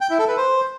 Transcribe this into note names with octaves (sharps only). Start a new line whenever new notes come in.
G5
E4
A4
B4
C5